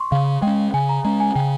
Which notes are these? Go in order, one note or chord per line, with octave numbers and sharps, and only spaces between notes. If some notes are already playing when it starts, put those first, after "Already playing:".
Already playing: C6 C#6
C#3 F5
G#3 C#4 G5
C#3 G#5
A#5
G#3 C#4 A#5
G#5
C#3 G5